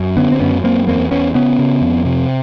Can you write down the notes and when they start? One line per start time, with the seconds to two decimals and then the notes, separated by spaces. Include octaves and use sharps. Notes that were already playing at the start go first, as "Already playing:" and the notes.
Already playing: F#2
0.17 D3 B3 C#4
0.32 C4
0.40 F#2 B3 C#4
0.64 F#2 A#3 C4
0.87 E2 A#3 C4
1.11 E2 B3 C#4
1.34 C#3 B3 C#4
1.59 C#3
1.81 F2
2.05 C3